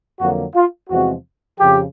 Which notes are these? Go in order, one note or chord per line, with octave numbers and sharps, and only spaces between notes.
F2 D3 F#3 A#3 F#4
F4
E2 C3 F3 G#3 C4 F#4
F2 C#3 F3 G4